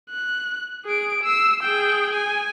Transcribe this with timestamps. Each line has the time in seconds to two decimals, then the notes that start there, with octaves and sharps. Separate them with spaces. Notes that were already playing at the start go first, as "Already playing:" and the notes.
0.10 F#6
0.85 G#4 D7
1.24 E6 C7
1.63 G#4 G5
2.14 G#5